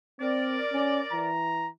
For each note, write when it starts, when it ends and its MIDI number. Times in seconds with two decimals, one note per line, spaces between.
0.20 0.60 60
0.20 1.29 70
0.20 1.29 74
0.73 1.01 61
1.12 1.69 52
1.12 1.69 82